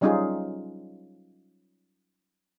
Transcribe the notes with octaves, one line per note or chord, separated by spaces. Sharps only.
F#3 G3 C#4 D#4 F4 G#4